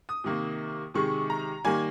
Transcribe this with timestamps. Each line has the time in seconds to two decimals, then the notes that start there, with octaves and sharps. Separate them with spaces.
0.09 D#6
0.24 C3 D#3 A#3
0.94 C3 D#3 G#3 C#6
1.30 A#5
1.64 D#3 G3 A#3 G#5